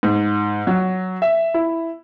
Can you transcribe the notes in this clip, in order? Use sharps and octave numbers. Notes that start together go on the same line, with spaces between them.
G#2
F#3
E5
E4